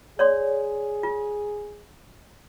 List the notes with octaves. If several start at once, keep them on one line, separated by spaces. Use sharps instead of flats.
G#4 C#5 D5 C6
F4